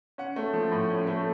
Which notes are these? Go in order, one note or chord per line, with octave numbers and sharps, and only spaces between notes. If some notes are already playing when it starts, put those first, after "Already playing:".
C#4 F#5
A3
F3
A2
C#4
A3